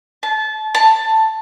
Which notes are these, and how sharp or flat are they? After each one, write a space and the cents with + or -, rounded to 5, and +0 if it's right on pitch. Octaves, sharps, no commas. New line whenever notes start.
A5 -25
A5 +10